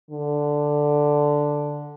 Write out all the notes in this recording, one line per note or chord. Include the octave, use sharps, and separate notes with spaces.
D3